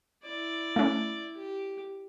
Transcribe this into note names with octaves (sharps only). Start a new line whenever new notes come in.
E4 D5
A3 C#4
G4